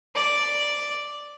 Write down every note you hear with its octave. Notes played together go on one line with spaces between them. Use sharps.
D5